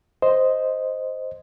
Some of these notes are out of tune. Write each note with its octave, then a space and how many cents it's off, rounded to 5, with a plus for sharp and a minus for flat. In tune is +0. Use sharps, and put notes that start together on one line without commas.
C5 +0 D#5 +0